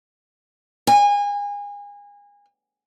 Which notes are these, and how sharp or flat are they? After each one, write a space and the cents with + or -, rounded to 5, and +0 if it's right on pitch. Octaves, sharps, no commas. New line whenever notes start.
G#5 -30